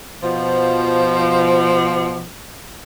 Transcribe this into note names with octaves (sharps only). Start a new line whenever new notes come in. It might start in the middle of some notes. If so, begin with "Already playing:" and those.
B2 F3